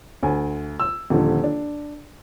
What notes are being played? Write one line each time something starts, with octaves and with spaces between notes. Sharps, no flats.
D2 G#5
E6
D#1 D3 F3
D4